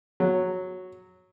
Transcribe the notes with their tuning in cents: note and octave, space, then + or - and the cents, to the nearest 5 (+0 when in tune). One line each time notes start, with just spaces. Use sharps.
F#3 -5